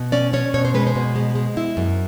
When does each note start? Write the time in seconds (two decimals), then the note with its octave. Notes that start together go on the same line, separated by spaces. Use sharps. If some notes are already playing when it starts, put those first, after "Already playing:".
Already playing: B2
0.12 C#4 D5
0.33 C#4 C#5
0.54 B2 C#5
0.65 C5
0.74 G#3 B4
0.87 C5
0.95 B2
1.16 G#3
1.35 G#3
1.57 E4
1.77 F#2